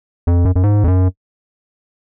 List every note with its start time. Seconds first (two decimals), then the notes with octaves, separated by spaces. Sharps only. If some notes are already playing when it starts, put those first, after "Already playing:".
0.27 F2
0.45 F#2
0.56 F#2
0.63 G#2
0.84 F2
0.88 F#2